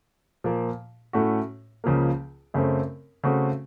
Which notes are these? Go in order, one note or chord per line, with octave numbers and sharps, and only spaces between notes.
A#2 F3 A#3
A2 A3 C#4 F#4
C#2 C#3 F3 A#3
F#2 C#3 A3 C4
C#3 A3 C4 F#4